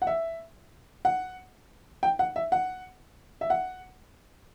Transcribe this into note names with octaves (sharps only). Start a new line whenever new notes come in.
F#5
E5
F#5
G5
F#5
E5
F#5
E5
F#5